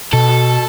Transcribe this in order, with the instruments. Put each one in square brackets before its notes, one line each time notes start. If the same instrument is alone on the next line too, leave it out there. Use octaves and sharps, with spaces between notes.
[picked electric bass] B2 [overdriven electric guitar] A4